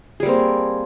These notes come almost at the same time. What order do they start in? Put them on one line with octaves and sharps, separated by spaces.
G#4 G3 A#3 C4